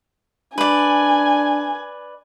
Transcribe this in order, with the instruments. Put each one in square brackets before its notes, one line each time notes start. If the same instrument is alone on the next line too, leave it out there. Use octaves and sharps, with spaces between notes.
[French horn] D4 [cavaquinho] B4 D5 [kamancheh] G#5